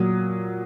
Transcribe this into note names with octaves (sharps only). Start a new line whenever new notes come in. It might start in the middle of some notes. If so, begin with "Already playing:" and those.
Already playing: A#2 F#3 D#6